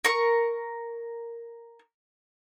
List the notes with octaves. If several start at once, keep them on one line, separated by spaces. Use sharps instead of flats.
A#4 C#6